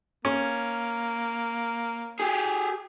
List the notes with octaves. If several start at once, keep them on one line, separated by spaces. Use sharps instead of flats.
A#3 C#4
G4 G#4